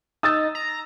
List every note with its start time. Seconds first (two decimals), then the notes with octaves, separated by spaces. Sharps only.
0.23 D#4 D#6 E6 A6
0.55 A#5